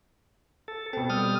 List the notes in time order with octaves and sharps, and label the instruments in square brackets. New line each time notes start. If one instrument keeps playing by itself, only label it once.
[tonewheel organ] A4
[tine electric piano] B2 C4 [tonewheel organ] A4
[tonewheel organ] G3 D#6 F6